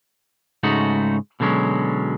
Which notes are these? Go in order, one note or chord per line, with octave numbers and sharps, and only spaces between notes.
G#2 C#3 G#3 A3 D#4 F#4
B2 D3 F#3 G#3 C#4